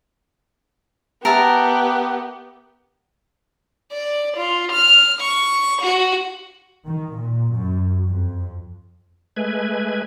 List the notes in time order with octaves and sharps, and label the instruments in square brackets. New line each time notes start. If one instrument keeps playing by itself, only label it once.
[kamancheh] B3 G4 [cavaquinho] A#4 E5 A5
[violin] D5
F4
F6
C#6
F#4
[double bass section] D#3
A#2
F#2
F2
[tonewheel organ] G#3 A3 B4 G#5